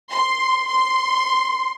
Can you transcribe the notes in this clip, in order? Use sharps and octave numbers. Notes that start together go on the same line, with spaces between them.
C6
C6